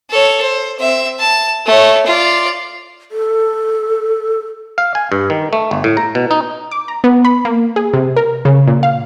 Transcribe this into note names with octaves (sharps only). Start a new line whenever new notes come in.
A4 C#5
C5
C4 E5
A5
A3 C#5
F4 D5
A4
F5
G#5
G2
D#3
A3
G1
A2
A#5
B2
D#4
D6
A#5
B3
B5
A#3
G#4
C3
A#4
C#3
A#2
F5